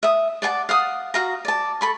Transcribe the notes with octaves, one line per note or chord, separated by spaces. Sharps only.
E5 D#6
D5 F#5 G#5 A5
F5 F#5 D#6
F#4 F5 A#5
D5 A5
A4 B5 C#6